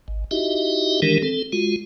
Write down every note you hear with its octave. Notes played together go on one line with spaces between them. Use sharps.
G#1
D#4 E4 F#4 G4 D#5 E5
D#3 E3 G#3 D4 G4 A#4
C4 A4
G#3 F4 F#4